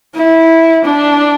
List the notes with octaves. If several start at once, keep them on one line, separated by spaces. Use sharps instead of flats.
E4
D4